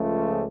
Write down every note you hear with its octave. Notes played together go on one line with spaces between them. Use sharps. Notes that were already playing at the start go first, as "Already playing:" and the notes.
Already playing: C#2 C#3 F3 A3